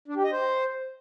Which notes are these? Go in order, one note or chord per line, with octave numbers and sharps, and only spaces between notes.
D4
G4
D#5
C5